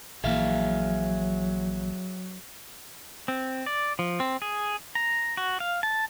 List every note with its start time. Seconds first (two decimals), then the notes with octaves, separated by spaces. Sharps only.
0.24 A#1 E3 F#3 A#3 G#4 E5 F5
3.28 C4
3.66 D5
3.99 F3
4.20 C4
4.42 G#4
4.95 A#5
5.37 F#4
5.60 F5
5.83 A5